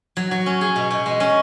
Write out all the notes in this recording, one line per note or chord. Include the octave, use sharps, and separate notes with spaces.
F#3
F#3
C#4
G#4
B2
B2
G#3
C#4